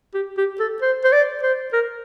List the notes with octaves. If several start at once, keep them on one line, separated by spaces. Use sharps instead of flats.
G4
G4
A4
C5
C5
D5
C5
A#4